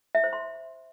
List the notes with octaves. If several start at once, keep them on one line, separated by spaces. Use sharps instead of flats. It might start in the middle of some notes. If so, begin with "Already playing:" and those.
E5
C5
C6